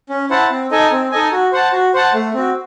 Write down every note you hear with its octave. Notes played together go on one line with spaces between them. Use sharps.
C#4
E4 C5 F#5 A5
C4
D#4 A4 D#5 G#5
C4
D#4 A4 D#5 G#5
F#4
C5 F#5 A5
F#4
C5 F#5 A5
A3
C4 F#4